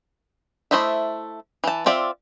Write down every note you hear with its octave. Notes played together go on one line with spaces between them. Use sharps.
A3 E4 C5 D#5 E5
E3 A5
C4 F4 D5 E5